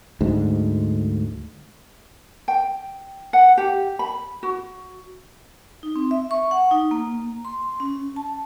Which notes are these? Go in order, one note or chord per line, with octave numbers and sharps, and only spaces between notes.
D2 G#2
G5
F#5
G4
B5
F#4
D#4
C4
E5
C#6
F#5
D#4
A#3
C6
C#4
A5